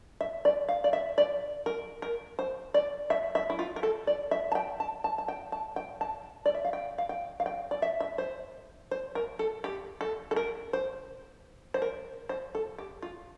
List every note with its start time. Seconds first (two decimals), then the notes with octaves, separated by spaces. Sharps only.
0.21 E5
0.45 D5
0.69 F5
0.84 D5
0.93 E5
1.18 D5
1.66 A#4
2.02 A#4
2.39 C5
2.74 D5
3.10 E5
3.35 E5
3.50 E4
3.59 F4
3.76 A#4
3.83 A4
4.07 D5
4.31 E5
4.52 A5
4.55 G5
4.80 A5
5.04 A5
5.18 A5
5.28 G5
5.52 A5
5.76 G5
6.01 A5
6.46 D5
6.54 E5
6.65 F5
6.73 G5
6.98 F5
7.09 G5
7.40 F5
7.46 G5
7.71 D5
7.82 E5
8.00 E5
8.18 C5
8.91 C5
9.15 A#4
9.39 A4
9.64 G4
10.01 A4
10.31 A4
10.36 A#4
10.73 C5
11.74 C5
11.82 A#4
12.29 C5
12.55 A4
12.78 G4
13.02 F4